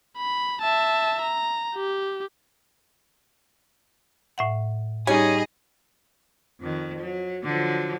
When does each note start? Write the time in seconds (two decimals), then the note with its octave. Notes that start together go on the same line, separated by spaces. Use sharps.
0.17 B5
0.62 E5 A5
1.22 A#5
1.75 G4
4.38 A2 E5 F#5
5.07 G3 C#4 D#4 G#4 D#5
6.61 F2 D#3
7.00 F#3
7.44 D3 F3 F#3